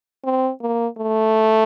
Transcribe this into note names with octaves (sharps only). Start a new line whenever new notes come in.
C4
A#3
A3